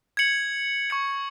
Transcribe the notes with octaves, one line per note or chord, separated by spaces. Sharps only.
G#6 C#7 F#7
C#6 G#6 C#7